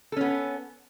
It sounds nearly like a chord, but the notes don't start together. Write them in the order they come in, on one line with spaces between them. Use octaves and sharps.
A4 C#4 B3